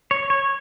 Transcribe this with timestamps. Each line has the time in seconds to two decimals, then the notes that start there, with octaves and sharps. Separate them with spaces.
0.11 C#5
0.30 C#5